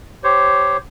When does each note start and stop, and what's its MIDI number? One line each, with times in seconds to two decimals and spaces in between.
0.24 0.77 67
0.24 0.77 72
0.24 0.77 73